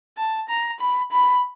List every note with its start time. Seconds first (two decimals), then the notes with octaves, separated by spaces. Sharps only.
0.17 A5
0.49 A#5
0.80 B5
1.11 B5